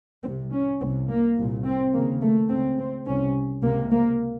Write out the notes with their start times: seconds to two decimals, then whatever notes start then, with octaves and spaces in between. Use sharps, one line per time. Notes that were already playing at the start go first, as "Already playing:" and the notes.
0.24 C2 C3 C4
0.52 C#4
0.81 C2 C3 C4
1.09 A#3
1.37 C2 A#2
1.65 C4
1.94 D#2 C#3 A#3
2.22 A3
2.50 C#2 C#3 C4
2.79 C4
3.07 C2 C3 C#4
3.63 C#2 C3 A#3
3.91 A#3